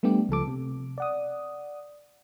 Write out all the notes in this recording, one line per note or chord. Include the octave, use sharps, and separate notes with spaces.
G3 A3 B3 D4 G4
C#2 F3 A4 D6
C3
D5 F#5 D#6